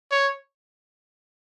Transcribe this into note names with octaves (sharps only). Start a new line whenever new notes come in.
C#5